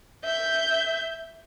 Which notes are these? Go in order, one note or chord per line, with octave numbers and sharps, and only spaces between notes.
E5 G6